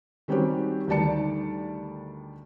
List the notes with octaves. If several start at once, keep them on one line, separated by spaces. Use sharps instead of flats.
D#3 G3 C4 C#4 F#4 G4
D2 D#3 G3 D5 A5 C#7